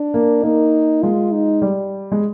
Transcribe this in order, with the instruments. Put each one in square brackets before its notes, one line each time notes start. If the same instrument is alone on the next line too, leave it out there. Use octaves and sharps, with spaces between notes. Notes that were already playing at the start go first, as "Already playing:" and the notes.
Already playing: [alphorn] D4
[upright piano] A#3
[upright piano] A#3 [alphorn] D#4
[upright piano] G#3 [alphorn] F4
[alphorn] D#4
[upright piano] G3
G#3